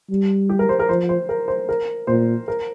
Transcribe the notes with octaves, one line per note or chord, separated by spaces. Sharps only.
G3
G4
A#4
C5
A#4
F3 C5
C5
A#4
C5
A#4
A#2 C5
A#4